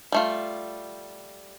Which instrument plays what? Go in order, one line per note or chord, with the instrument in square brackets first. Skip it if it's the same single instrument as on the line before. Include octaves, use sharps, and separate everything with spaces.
[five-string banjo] G3 A3 F4